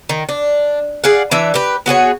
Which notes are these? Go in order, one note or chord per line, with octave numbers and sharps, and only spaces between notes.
D#3
D4
G#4 D5 F5 F#5
E3 D4 E5
G4 B4
B3 F#4 G#4 C#5